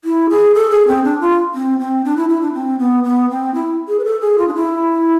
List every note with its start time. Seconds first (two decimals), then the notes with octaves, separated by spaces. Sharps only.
0.04 E4
0.30 G#4
0.55 A4
0.71 G#4
0.87 C4
1.04 D4
1.21 F4
1.55 C4
1.79 C4
2.05 D4
2.17 E4
2.29 E4
2.41 D4
2.54 C4
2.79 B3
3.04 B3
3.30 C4
3.54 E4
3.88 G#4
3.99 B4
4.05 A4
4.21 G#4
4.38 F4
4.48 D4
4.55 E4